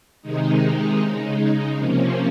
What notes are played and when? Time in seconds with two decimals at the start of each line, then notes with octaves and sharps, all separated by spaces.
0.22 C3 D#3 G#3 D#4
1.00 C#3 G#3 D#4
1.78 C3 F3 A#3 C#4